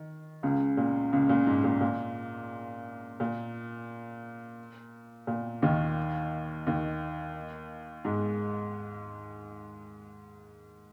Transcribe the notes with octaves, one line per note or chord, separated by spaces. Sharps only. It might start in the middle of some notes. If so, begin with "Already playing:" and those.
Already playing: D#3
C#2 C#3
A#2
C#2 C#3
A#2
G#2
A#2
A#2
A#2
A#2
D#2 D#3
D#2 D#3
G#2 G#3